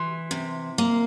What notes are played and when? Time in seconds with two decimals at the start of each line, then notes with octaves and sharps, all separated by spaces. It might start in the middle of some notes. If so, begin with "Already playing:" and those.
Already playing: E3 C6
0.31 C3
0.78 A#3